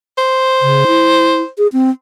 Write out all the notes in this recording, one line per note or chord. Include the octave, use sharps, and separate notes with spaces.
C5
C#3
E4
G#4
C4